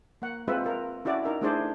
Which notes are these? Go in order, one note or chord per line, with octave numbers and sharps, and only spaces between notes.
A#3 F#5
G#3 C4 F4 B4 E5
F4 A#4
C#4 E4 F#4 D5
D#4 A#4 E5
A3 D4 E4 G#4 C5 D5